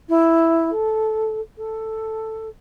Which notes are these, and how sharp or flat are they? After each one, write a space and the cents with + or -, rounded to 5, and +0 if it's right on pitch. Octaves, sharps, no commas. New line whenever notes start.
E4 +0
A4 -10
A4 +5